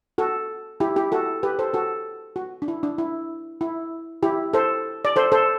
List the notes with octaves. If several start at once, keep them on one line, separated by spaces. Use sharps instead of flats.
F#4 A4
E4 G4
E4 G4
F#4 A4
G4 B4
A4 C5
F#4 A4
F#4
D4
E4
D4
E4
E4
E4 G4
A4 C5
D5
A4 C5
A4 C5